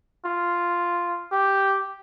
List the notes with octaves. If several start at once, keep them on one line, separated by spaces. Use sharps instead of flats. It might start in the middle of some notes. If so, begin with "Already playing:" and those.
F4
G4